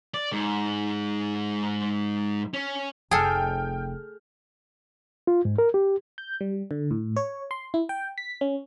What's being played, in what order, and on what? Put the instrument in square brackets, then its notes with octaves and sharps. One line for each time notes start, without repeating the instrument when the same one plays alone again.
[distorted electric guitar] D5
G#2
C#4
[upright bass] F1 [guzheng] G#4 A4 [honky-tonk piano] G5 F6
[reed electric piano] F4
G#2
A#4
G4
[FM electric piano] G6
G3
D3
A2
C#5
C6
E4
G5
B6
C#4